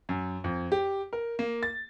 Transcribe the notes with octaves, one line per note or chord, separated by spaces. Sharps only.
F#2
F2
G4
A#4
A#3
A6